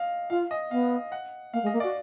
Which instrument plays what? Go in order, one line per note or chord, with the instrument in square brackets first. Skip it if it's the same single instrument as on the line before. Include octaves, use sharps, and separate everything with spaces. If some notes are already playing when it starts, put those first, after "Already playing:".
Already playing: [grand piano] D#5 F5
[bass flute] F4 [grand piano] F5
[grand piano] D#5
[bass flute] B3 [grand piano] F5
[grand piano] F#5
[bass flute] A#3 [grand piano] F5
[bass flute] G#3
[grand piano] D#5
[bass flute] A#3
[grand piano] D5
[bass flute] F#4